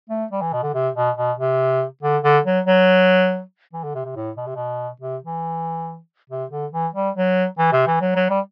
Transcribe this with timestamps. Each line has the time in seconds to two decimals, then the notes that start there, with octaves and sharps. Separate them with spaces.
0.10 A3
0.32 G3
0.42 E3
0.53 B2
0.63 D3
0.74 C3
0.95 B2
1.17 B2
1.38 C3
2.03 D3
2.24 D3
2.45 F#3
2.66 F#3
3.73 E3
3.84 D3
3.95 C3
4.05 C3
4.16 A2
4.37 B2
4.46 C3
4.56 B2
5.02 C3
5.24 E3
6.30 C3
6.51 D3
6.72 E3
6.95 G3
7.16 F#3
7.58 E3
7.72 C3
7.87 E3
8.01 F#3
8.16 F#3
8.30 G3